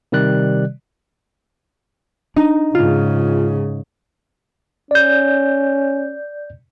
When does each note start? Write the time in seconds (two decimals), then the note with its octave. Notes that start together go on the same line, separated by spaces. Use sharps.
0.12 C3 D#3 G3 D5 F#6
2.36 D4 D#4
2.75 G#2 C#3 F4
4.91 C#4 D5 G6